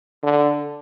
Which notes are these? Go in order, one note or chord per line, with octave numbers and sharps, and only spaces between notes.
D3